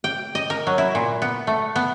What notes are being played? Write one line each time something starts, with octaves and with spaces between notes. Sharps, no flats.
G5
D#5
A#4
F#3
E4
A#2
B3
A3
B3